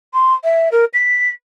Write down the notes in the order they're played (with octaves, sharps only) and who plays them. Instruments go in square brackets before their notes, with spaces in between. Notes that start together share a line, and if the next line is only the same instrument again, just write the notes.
[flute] C6
E5
A#4
B6